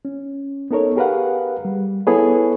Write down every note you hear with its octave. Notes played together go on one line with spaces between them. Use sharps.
C#4
B3 D#4 A4 A#4 C#5
G4 G#4 A#4 B4 F5 F#5
G3
B3 E4 G#4 A4 B4 C#5